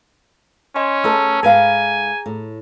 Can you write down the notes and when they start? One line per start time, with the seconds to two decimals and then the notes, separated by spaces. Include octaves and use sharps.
0.76 C#4 D#5 G#5 C6
1.04 A3 G#4 B4 A5 A#5 E6
1.43 G#2 G#4 B4 F5 G#5 A#5
2.26 A2